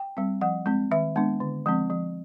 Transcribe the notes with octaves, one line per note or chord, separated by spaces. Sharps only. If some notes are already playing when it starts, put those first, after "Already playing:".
Already playing: G5
G3 C4
F3 F#5
G#3 C4
D#3 E5
G#3 B3 D4
D3
F3 G#3 C4
F3